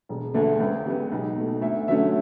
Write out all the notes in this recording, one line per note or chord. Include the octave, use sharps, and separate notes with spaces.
E1
D2 D3 A3
C#2
C#3 G3 B3
B1
B2 A3
D2 E5
D3 F#3 A3 C#4 E5